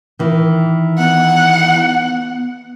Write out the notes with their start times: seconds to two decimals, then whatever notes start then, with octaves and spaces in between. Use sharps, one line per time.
0.19 D#3 E3
0.99 B3 F#5